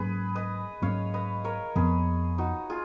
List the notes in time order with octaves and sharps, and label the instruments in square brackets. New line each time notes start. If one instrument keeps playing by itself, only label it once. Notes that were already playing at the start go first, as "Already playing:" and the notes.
Already playing: [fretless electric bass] G#2 F#3 A#3 C#4 [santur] G#4 B4
[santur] B4 D#5
[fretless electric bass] G#2 F#3 A#3 C#4 [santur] C#5 F5
[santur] B4 D#5
A#4 C#5
[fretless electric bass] F2 F3 B3 [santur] G#4 B4
[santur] D#4 F#4
F4 G#4